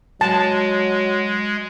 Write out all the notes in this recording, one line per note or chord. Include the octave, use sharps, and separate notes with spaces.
F#3 G#3 A5